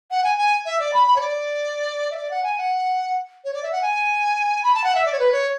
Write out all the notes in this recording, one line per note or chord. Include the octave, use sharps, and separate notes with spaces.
F#5
G#5
G#5
E5
D5
B5
B5
C#5
D5
E5
D5
F#5
G#5
F#5
C#5
D5
E5
F#5
G#5
B5
A5
F#5
E5
D5
C#5
B4
C#5